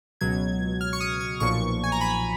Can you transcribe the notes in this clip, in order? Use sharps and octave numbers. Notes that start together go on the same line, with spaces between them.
C#2 B2 F#3 G#6
F6
C#6
D#6
C#6
B1 A#2 F3 C#6
G#5
A#5
B5